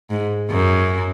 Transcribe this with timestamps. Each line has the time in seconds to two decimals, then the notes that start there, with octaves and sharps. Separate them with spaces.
0.10 G#2
0.51 F#2